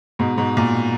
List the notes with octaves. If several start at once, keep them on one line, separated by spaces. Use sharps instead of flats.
G#2 B2
G#2 B2
A#2